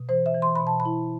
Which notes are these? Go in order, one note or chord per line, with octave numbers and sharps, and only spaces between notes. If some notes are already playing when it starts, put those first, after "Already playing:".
Already playing: B2
E3 C5
E5
E3
C6
B2 B5
A5
B5
E4